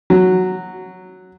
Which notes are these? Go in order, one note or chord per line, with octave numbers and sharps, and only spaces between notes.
F#3